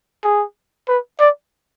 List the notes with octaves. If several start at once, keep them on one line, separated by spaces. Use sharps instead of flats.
G#4
B4
D5